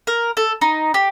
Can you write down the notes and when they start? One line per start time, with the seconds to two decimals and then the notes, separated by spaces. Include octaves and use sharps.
0.07 A#4
0.37 A4
0.61 D#4
0.94 G4